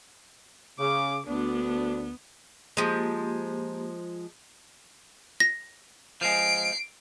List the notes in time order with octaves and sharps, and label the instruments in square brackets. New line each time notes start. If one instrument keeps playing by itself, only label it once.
[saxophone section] C#3 [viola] D6
[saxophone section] D2 D4 [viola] B3
[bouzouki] F3 G#3 [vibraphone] A#3 G4
[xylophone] A#6
[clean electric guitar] F3 G#3 [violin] C7 D7